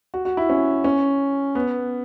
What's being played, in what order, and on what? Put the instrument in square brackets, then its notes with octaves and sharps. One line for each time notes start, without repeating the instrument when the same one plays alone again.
[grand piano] F#4
F#4
E4
C#4
C#4
B3